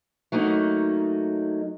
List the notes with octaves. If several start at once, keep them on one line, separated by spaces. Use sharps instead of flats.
F#3 A3 A#3 C#4 D#4